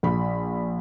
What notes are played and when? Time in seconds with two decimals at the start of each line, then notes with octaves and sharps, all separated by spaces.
0.03 A#1 B5